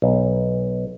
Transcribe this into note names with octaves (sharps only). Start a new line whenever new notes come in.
B1